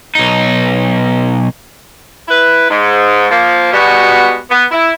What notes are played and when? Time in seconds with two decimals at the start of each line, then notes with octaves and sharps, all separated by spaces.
0.15 B1 D#4
2.28 E4 B4
2.70 G#2
3.31 F3 A#3
3.73 B2 G3 G#3 B3 F#4
4.51 B3
4.71 E4